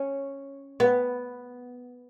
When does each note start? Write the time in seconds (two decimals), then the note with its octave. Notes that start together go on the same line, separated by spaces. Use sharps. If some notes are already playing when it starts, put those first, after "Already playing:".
Already playing: C#4
0.80 B3